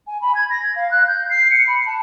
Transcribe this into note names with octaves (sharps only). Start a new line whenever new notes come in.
G#5
B5
G#6
A#6
G#6
F5
F#6
G6
C7
C#7
B5
A5